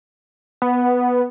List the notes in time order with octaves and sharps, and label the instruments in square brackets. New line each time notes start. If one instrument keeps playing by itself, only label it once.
[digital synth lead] B3